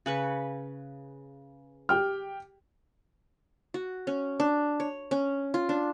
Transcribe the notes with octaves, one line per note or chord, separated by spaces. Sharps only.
C#3 B4 C#6
G4 G5 F6
F#4
C#4
D4
C#5
C#4
F4
D4